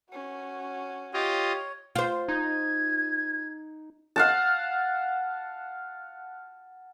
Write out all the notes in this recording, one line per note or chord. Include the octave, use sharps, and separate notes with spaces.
C#4 F#4
F4 G4 C#5 D#5
F4 C5
D#4 G#6
F5 F#5 A5